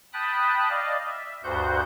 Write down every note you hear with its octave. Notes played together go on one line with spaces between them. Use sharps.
G5 A5 B5 D#6 F#6
D5 D#5 F5
E5
D2 G2 F#4 C5 F#5 G6